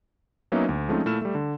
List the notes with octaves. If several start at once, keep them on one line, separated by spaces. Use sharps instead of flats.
F#3 A#3 B3 C#4 D#4 E5
D2
F3 G#3 A3 C4 C#4 D#4
A#2 A3 E4 F6 E7
G3 A3
D3